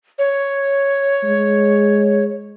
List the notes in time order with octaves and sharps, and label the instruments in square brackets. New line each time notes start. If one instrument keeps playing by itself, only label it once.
[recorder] C#5
[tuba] G#3